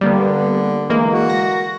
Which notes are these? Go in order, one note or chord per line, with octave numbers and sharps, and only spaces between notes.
D3 G3 A#3 B3
E3 G#3 A#3
F#4
A#6